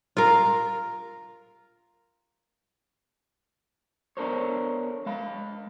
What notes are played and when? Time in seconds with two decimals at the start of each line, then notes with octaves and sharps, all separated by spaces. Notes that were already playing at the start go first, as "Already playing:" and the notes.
0.17 F4 A#4
4.17 B3 D4 A4 A#4 C5 C#5
5.06 G#3 F5 B5